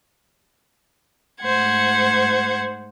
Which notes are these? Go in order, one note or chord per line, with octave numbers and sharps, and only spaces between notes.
G#2 A3 C5 F#5 G#6